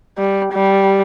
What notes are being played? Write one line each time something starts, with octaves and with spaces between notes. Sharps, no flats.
G3
G3